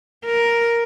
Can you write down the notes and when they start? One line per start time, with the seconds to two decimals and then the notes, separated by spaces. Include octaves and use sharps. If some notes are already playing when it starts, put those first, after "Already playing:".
0.25 A#4